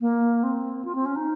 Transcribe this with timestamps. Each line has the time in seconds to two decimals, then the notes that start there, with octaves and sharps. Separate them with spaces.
0.01 A#3
0.43 C4
0.85 F4
0.95 C4
1.05 C#4
1.15 D#4